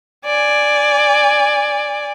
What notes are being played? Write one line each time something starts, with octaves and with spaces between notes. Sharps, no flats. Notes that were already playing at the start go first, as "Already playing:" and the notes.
D5 G#5